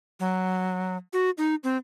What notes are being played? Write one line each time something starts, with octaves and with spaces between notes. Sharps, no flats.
F#3
F#4
D#4
C4